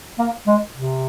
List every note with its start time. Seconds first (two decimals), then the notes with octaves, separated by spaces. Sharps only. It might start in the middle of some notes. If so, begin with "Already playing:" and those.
0.19 A#3
0.47 G#3
0.76 C3